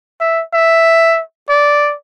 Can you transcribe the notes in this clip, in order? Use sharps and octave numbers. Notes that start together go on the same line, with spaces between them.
E5
E5
D5